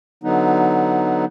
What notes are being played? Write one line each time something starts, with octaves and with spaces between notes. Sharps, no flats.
D3 F#3 B3 D#4